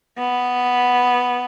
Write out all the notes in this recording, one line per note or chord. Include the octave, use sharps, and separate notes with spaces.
B3